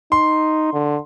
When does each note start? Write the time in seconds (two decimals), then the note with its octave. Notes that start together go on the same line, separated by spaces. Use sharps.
0.12 D#4 C6
0.73 D3